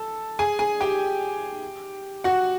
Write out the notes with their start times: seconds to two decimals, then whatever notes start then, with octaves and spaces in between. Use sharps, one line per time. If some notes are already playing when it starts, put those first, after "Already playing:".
Already playing: A4 A5
0.39 G#4 G#5
0.59 G#4 G#5
0.81 G4 G5
2.24 F#4 F#5